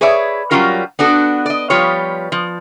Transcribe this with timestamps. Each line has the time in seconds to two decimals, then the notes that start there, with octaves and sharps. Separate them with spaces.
0.01 G#4 B4 C#5 D5 E5
0.51 F#3 G3 C#4 F4 A#4
0.99 B3 D4 F#4 A4
1.46 D5 D#5
1.70 F3 G3 F4 B4 C#5
2.32 F3